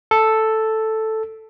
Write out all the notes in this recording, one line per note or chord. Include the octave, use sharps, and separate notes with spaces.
A4